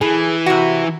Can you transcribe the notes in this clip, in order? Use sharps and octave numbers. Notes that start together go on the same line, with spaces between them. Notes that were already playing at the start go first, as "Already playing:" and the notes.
E3 G#4
C3 F#4